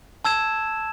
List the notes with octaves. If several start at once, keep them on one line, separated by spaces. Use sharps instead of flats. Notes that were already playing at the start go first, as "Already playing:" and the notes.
A5 E6 G#6 E7